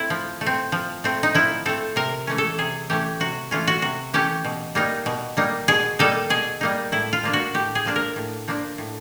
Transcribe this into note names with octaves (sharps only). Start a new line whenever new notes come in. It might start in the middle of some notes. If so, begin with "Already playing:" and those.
Already playing: A3 C4 E4
F3
A3
C4
F3
A3 C4
D#4
F3 E4
A3 C4 A4
C3 A#4
E3 A3 C#4
A4
C3 G#4
E3 A3 C#4 G4
C3 F#4
E3 A3 C#4 F4
F#4
C3 F#4
E3 A3 C#4 G4
B2
G3 A#3 D#4
B2
G3 A#3 D#4
B2 G#4
G3 A#3 D#4 A4
B2 G#4
G3 A#3 D#4
A2 E4
F4
F3 A#3 D4
F#4
A2 G4
G#4
F3 A#3 D4
A#4
A2
F3 A#3 D4
A2